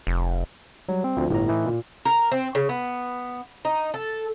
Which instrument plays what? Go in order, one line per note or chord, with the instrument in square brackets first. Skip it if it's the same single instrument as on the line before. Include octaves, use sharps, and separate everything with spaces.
[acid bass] F1
[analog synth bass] F#3 [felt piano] G3
[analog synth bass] C4
[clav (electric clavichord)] D2 [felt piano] F3
[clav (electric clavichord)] G1 A#5 [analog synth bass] A2 [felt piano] E4
[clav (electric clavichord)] E3 D#4
[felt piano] A#2
[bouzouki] A#4
C4
C#3
B3
D#4
A4